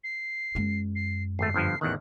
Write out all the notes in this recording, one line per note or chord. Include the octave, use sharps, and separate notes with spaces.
C7
F#2 G#3
C7
G#1 A3 C7
G1 G2 F3
A1 E2 D#3 F#6